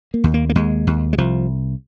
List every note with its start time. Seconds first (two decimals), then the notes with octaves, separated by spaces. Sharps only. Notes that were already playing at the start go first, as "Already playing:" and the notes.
0.14 A#3
0.24 D#2
0.34 A#3
0.49 A#3
0.55 D#2 G#3
0.87 D#2
1.13 G#3
1.18 C2 F3